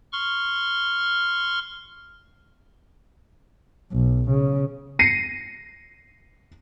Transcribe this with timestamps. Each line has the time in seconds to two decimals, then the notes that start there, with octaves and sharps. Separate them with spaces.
0.13 C6 C#6 F6
3.93 B1
4.30 C#3
4.99 A#6 C7 C#7 D#7